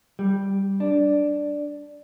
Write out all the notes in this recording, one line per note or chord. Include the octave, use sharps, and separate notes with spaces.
G3
D4